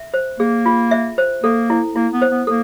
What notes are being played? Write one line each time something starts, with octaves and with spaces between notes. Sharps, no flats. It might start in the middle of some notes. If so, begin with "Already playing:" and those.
Already playing: E5
C5
A#3 G#4
F4
E5
C5
A#3 A4
E4
A#3 E4
B3
C5
B3
A#3 A4